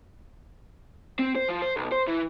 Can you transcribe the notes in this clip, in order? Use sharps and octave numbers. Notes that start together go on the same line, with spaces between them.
C4
C5
F3
C5
B1
C5
E3